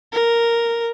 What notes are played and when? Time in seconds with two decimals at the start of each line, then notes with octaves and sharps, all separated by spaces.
0.12 A#4